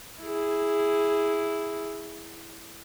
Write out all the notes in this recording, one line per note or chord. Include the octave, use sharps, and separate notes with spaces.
E4 G#4